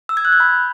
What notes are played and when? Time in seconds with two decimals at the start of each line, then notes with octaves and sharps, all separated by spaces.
0.09 E6
0.17 G#6
0.25 F#6
0.32 G6
0.40 B5